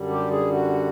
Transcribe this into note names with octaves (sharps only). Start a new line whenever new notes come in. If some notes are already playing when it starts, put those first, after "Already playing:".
Already playing: F#2 D3 G3
G4
G#4
F#4